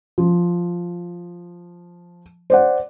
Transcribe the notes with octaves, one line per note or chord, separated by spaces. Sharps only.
F3
C5 D5 F#5